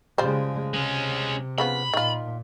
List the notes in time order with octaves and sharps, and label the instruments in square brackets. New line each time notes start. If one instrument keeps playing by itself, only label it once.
[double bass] C#3 G#3 [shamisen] F3 G3 C5
[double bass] C3 [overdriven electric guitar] G#3 C#4
[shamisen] C#3 F3 B3 [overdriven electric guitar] B5
[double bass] A#2 [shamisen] D#3 F4